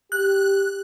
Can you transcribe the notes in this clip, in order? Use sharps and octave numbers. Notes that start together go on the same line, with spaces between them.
G4 F#6